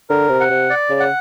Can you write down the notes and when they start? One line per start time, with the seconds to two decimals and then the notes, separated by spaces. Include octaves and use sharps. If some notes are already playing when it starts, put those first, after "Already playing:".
0.10 D3 A#4
0.29 C3
0.40 F#5
0.50 C3
0.70 D5
0.90 C#3
1.00 F#5